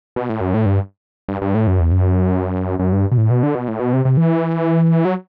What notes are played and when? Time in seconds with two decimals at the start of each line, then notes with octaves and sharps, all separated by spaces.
0.16 B2
0.29 A2
0.41 F#2
0.54 A2
0.66 G2
1.29 G2
1.42 G2
1.55 A2
1.67 F#2
1.80 E2
1.92 F#2
2.79 F#2
2.92 G2
3.12 B2
3.18 A2
3.30 B2
3.43 D3
3.55 B2
3.68 A2
3.80 B2
3.93 C3
4.05 C3
4.17 E3
5.05 F#3